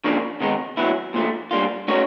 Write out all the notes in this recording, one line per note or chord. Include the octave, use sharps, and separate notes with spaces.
C#3 F3 A#3 D4
C3 D#3 G#3 B3 D#4
A2 F#3 B3 E4
A#2 F3 A3
G3 A#3 D4 F4
A3 C#4 F#4 A#4 C#5